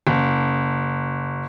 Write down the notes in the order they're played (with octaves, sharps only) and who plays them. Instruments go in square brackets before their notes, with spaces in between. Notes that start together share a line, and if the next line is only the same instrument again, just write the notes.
[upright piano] F#1